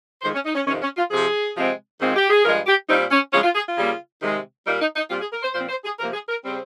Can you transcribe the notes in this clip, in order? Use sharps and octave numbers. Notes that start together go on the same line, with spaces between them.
F2 D#3 G#3 C5
C#4
D#4
C#4
F2 C3 D#3 C#4
C#4
F4
F2 C3 F3 G#4
C3 F3 G#3 C4
G#2 D#3 G#3 C4 F4
G4
G#4
G2 F3 G#3 A#4
G4
A#2 G3 C4 D#4
C#4
C#3 F3 G#3 C#4
F4
G#4
F4
C#3 G3 A#3
C3 D#3 G#3
A#2 G3 A#3 D#4
D#4
D#4
A#2 G3 C4 F4
G#4
A#4
C5
A#2 F3 C4 C5
C5
G#4
C3 F3 A#3 A#4
G#4
A#4
C#3 G3 C4